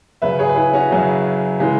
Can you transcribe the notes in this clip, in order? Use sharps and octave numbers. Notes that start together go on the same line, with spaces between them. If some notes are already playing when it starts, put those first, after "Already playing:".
F#2 C#3 F#3 B4 E5
G#4 C#5
B4
E4 G#4
C#4 F#4
F#2 C#3 F#3
C#3 E3 G#3